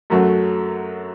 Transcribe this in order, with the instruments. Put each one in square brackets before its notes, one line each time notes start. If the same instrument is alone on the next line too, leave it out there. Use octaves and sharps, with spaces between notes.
[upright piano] F#2 F#3 A3 F#4